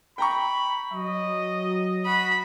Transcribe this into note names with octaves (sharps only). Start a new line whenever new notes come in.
G5 A#5 B5 C#6
F#3 D#5
F#4 B5